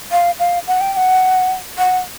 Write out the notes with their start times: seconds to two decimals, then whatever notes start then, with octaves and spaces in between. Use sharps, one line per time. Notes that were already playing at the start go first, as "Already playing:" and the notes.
0.12 F5
0.39 F5
0.67 F#5
0.81 G5
0.93 G5
0.97 F#5
1.78 F#5